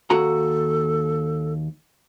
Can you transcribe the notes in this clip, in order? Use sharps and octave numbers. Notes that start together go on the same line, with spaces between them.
D#2 F#4 A4 A#5